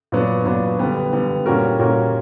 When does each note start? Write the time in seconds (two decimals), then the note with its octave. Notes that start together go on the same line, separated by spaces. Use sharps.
0.12 A#2 F#3 B3 D4
0.45 A#2 F#3 B3 D4
0.79 D3 G3 B3
1.13 D3 G3 B3
1.46 A#2 G3 C#4 F#4 A#4
1.79 A#2 G3 C#4 F#4 A#4